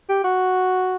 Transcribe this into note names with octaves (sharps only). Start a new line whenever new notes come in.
G4
F#4